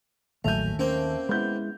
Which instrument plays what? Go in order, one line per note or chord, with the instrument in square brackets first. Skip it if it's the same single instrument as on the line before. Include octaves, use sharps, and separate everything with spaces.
[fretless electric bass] A1 F#3 [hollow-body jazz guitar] D#2 [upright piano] A3 E5 G6 [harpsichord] G#5 A#5
[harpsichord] A#3 C4 G5 [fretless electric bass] C#4
[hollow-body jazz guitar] G#3 E4 [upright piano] B3 G6